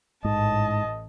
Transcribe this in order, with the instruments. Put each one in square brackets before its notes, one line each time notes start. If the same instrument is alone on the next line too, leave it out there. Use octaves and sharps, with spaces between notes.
[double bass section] A1 [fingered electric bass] G#2 [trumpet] D#5 [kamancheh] A5